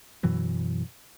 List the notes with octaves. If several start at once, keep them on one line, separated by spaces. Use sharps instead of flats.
F#2 B2 E3 F#3